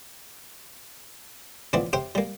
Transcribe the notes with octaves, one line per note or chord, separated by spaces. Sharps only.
A1 D2 F3 B3 C4 D5
C3 G4 C5 G5 C6
G3 A#3